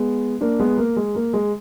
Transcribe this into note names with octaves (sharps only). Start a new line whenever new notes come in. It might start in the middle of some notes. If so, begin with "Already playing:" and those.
Already playing: G#3 B3
A#3 D4
G#3 B3
A#3
G#3
A#3
G#3